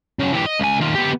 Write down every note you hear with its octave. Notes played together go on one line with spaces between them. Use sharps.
C#3 F#3
E3 G4
D#5
C#2 G#5
D#3 F4
B3 G4